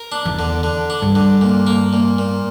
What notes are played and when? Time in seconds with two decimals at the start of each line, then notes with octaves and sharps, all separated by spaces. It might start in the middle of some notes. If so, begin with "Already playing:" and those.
Already playing: A#4
0.12 D4
0.25 E2
0.39 D3
0.63 D3
0.90 D4
1.02 G2
1.15 D3
1.41 A#2
1.67 A#3
1.93 A#2
2.18 A#2